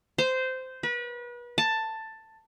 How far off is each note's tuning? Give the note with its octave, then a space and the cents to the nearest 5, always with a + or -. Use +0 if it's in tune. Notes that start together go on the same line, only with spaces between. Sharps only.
C5 -15
B4 -35
A5 +10